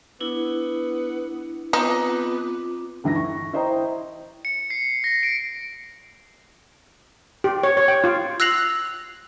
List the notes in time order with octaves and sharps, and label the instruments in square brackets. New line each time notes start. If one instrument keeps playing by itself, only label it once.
[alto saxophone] B3 [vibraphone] D4 E4
[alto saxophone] B3 [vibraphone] C4 F4 D6 [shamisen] D#4
[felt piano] D2 E3 D#4 A#6
C#6
E4 C5 D#5 G5 A#5
[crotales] C#7
C7
A#6
D7
[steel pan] G4
C#5
C#5
G5
F4
[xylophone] E6 F#6 A#6 C7 F7 F#7